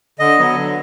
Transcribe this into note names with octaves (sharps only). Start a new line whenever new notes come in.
D3 D#5
F#3 B3
D3